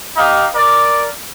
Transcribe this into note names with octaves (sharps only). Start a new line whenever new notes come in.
D#4 G4 F5
A#4 D5